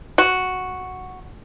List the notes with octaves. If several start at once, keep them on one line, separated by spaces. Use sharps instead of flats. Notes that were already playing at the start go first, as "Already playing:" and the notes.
F#4